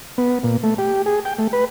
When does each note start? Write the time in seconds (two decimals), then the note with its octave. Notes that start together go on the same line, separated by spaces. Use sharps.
0.18 B3
0.43 A#2
0.63 A3
0.78 G4
1.06 G#4
1.25 G5
1.39 A3
1.53 B4